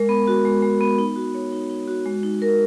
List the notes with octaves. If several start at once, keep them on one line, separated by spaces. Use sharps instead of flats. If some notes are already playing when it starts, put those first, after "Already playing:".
Already playing: G#3 A#4
B3
F#4
G#3
G#3
B3
D#4
F#4
C#5
D#4
D#4
F#4
G#3
D#4
A#4